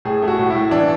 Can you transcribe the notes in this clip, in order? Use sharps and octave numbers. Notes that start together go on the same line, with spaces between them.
A2 G#4
A3
F#4
A2
A2 E4
E3 D4